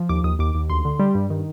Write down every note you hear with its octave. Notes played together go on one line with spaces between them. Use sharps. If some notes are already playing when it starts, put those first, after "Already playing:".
Already playing: F3
D#2 D6
D#2 D#6
D#2 D6
D#2
D2 C6
D3
G3
G2
D#3